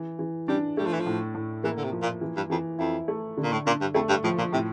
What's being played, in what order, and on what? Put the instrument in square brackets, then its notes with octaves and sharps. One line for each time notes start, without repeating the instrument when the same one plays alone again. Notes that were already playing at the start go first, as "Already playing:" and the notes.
Already playing: [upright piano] E3
E3
[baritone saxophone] G3 [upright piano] D4
[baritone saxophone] G3 [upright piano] A3
[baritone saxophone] F3
E3
F3
[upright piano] A2
A2
[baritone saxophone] E3 [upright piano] A#3
[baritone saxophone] D3
C3
[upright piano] F3
[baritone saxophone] A#2
[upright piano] E3
[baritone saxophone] G2
[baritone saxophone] F2 [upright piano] E3
[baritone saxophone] F2 [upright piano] E4
[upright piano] A3
D3
[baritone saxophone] A#2
A2
[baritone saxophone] A#2 [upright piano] D4
[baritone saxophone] G2
[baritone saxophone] F2 [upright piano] A3
[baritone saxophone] G2
[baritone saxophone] A2 [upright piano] F3
[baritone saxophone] A#2
[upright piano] A2 [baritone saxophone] C3